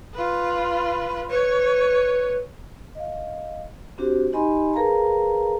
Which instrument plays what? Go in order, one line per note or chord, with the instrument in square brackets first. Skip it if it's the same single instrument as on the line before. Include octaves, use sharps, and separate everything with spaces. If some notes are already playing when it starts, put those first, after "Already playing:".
[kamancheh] F4 B4
[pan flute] B4 [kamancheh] C#5
[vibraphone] D#5 F5
C4 D4 F#4 G4 C5
D#4 G4 D#5 G#5 B5 C6
G#4 A#4 B4 F5 A5 A#5